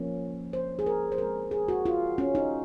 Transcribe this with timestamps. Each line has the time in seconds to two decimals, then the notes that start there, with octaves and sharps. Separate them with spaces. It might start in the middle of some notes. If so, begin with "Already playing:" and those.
Already playing: F3 A#3 C#4
0.53 C5
0.79 G#4
0.86 A#4
1.12 C5
1.18 F3 G#3 C4 A#4
1.51 G#4
1.68 F#4
1.86 F4
2.18 C#4
2.35 D#4